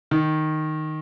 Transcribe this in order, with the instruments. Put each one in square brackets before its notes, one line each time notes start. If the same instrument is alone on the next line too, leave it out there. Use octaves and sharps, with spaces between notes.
[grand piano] D#3